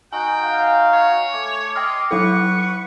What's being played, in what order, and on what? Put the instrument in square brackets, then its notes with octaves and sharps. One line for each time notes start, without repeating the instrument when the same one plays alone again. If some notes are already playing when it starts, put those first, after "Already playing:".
[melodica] D#4 F#4 [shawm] G5 [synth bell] G#5
[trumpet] F5
[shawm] C#5
[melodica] A3 [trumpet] D6
[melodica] D#5 C6 [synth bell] G5 D#6 F6
[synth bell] F#3 E4 A4 [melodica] B4 F#5 [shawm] C#6